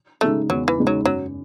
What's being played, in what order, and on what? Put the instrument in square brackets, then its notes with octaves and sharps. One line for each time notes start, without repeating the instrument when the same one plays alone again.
[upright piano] C#3 G#3 D#4 [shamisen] A3
[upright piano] E2 [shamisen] F#3
[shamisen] E3
[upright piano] C#3 G#3 D#4
[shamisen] F#3
[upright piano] F#2 [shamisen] F#3